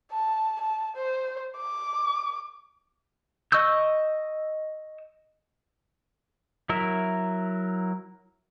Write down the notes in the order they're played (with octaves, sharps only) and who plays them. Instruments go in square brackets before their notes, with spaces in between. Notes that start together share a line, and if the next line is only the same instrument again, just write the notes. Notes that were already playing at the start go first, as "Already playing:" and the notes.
[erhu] A5
A5
C5
D6
[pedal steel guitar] D#5 C#6 E6 G6
F#3 E4 A#4 E5